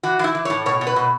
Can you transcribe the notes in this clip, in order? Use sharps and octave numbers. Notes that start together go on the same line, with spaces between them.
E3 F#4
E3 E4
E3
A2 C#5
B2 C#5
B2
B4
B2